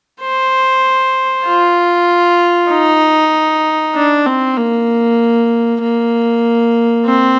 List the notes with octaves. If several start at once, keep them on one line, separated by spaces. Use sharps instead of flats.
C5
F4
D#4
D4
C4
A#3
A#3
C4